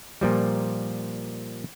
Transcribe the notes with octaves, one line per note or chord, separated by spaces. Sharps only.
A#2 F3 G3